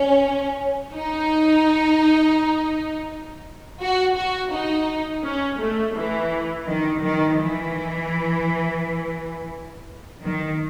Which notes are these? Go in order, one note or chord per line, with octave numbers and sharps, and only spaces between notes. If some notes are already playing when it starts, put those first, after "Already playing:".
Already playing: C#4
D#4
F#4
F#4
D#4
C#4
A3
E3
D#3
D#3
E3
D#3